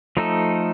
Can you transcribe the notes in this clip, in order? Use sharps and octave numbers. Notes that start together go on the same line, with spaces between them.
F3 A3 D#4 A4